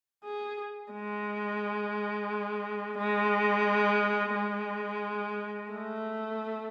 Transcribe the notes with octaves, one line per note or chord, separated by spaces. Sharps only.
G#4
G#3
G#3
G#3
A3